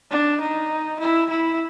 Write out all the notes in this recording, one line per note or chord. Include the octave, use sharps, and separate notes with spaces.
D4
D#4
E4
E4